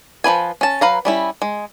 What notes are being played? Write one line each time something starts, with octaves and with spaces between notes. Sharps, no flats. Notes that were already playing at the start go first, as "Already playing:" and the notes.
F3 F4 B4 G#5
C#4 A5
F#3 B4 F5 A#5
G3 C#4 E4
G#3